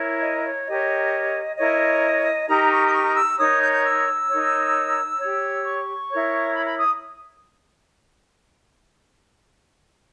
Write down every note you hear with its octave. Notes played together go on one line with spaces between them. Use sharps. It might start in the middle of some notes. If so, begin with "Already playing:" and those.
Already playing: E4 A#4 C#5
D#5
C#5
G4 A#4 C#5 D#5
E4 A#4 C#5 D#5
D#4 G4 A#4 A#5
C#6
D#6
C#6
E6
D#4 A#4 C#5 D#6
G6
G6
E6
D#4 A#4 C#5
G4 C#5
C#6
E4 A#4 C#5
B5
B5
D#6